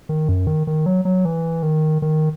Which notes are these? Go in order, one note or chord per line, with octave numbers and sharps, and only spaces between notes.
D#3
F#2
D#3
D#3
F#3
F#3
E3
D#3
D#3